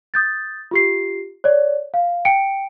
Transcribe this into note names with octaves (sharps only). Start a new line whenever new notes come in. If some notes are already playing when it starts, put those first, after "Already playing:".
D#6 G6 A6
F4 G4 C7
C#5 D5
F5
G5 C#7 D7